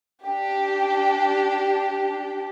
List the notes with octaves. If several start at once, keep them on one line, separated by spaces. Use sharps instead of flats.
D4 G4